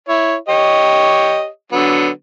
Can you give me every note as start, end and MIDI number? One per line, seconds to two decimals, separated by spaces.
0.09 0.35 64
0.09 0.35 73
0.49 1.47 67
0.49 1.47 73
0.49 1.47 75
1.72 2.09 50
1.72 2.09 54
1.72 2.09 59